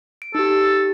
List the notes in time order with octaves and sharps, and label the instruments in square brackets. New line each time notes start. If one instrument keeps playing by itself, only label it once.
[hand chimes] D7
[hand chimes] D#4 G4 [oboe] A4